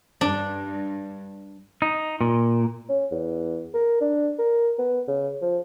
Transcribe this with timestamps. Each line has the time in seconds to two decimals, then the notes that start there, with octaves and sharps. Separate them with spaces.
0.21 G2 D4
1.82 D#4
2.21 A#2
2.89 C#4
3.12 E2
3.74 A#4
4.01 D4
4.39 A#4
4.79 B3
5.08 C#3
5.42 F3